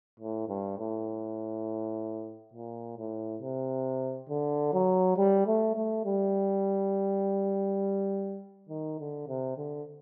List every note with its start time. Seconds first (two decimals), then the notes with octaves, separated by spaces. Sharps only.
0.19 A2
0.49 G2
0.78 A2
2.53 A#2
2.98 A2
3.42 C3
4.29 D3
4.73 F#3
5.17 G3
5.47 A3
5.76 A3
6.05 G3
8.69 D#3
8.99 D3
9.28 C3
9.57 D3